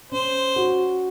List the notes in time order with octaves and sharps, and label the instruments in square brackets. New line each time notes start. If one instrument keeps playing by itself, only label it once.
[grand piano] C#4 [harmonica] C5
[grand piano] F#4